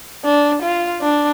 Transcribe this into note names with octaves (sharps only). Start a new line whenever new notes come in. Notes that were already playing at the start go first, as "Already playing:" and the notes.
D4
F4
D4